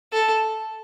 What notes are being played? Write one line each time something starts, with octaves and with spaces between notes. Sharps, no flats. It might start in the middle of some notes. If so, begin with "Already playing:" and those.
A4